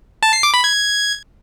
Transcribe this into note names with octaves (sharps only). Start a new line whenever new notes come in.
A5
C7
D6
B5
G#6